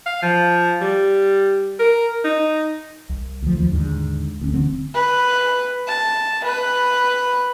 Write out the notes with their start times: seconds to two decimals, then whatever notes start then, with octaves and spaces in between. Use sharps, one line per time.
0.06 F5
0.22 F3
0.81 G3
1.79 A#4
2.25 D#4
3.09 C2
3.42 D2 F3
3.57 D#2 F3
3.72 D#2 G#2 D3
4.41 D2 C#4
4.54 D1 D3 C4
4.94 B4
5.87 A5
6.44 B4